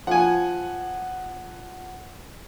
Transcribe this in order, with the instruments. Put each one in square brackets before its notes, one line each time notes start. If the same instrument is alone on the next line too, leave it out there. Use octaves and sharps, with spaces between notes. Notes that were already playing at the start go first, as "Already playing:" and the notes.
[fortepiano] F3 G#5 [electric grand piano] F#5